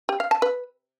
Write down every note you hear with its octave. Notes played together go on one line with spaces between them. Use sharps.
G4
F5
A5
B4